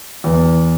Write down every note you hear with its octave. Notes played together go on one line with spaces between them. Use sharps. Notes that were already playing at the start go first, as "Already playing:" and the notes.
E2